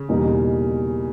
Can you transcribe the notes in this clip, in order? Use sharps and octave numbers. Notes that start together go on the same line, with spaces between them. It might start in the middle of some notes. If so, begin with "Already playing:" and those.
Already playing: C#3
E2 B2 G3 A#3 D#4